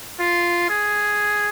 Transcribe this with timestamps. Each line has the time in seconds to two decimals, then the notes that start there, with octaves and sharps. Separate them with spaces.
0.19 F4
0.69 G#4